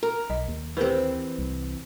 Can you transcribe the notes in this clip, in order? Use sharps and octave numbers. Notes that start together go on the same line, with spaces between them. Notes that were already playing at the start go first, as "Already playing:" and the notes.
A#4
B1 D#5
D#2
E3 C4 G4 A#4 B4
C2